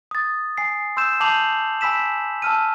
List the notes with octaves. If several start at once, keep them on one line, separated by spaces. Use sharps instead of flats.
D#6 A6
G#5 C7
C6 E6 G6 E7
A5 D6 G6 C7 F7 F#7
G#5 B5 E6 B6 E7
A5 E6 F6 D#7